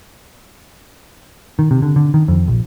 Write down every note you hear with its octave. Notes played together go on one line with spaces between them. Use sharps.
D#3
C3
D3
D3
D#3
F2
A#1